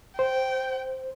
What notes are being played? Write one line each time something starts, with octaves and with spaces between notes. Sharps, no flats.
C5 G5